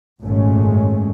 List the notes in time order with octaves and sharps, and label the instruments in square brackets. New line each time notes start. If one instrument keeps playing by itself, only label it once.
[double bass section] G#1 F#2 A#2 G#3 A3 C#4